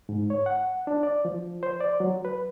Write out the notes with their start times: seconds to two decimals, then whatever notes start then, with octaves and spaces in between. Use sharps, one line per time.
0.09 G#2
0.30 C#5
0.46 F#5
0.87 D4
1.03 D5
1.25 F3
1.63 C5
1.81 D5
2.00 F#3
2.25 B4